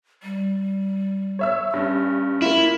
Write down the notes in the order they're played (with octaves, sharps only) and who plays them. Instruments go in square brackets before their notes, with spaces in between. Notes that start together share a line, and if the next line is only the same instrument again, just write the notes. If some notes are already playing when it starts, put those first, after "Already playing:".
[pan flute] G3
[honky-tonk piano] C#5 E5 E6
[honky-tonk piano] G2 [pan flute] C#4
[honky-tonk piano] A#3 F4 [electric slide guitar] E4